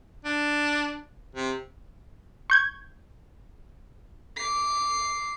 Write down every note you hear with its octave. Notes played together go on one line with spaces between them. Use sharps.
D4
C3
C#6 G6 G#6
D6 C7